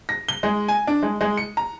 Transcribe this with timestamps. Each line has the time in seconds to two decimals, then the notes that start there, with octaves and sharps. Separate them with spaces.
0.09 A#6
0.29 G7
0.43 G#3
0.68 G#5
0.87 D4
1.03 G#3
1.21 G#3
1.37 C#7
1.57 A#5